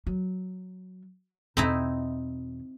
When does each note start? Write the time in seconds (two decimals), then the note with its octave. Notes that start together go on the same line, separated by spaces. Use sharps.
0.07 F#3
1.57 E2 B2 C4 D#4 E4